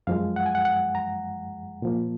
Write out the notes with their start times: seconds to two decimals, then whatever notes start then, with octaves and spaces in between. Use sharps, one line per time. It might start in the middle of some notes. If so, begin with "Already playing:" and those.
0.07 F#2 F3 G#3 F5
0.36 F#5
0.46 G#5
0.55 F#5
0.65 F#5
0.95 A#5
1.82 A#2 F3 A#3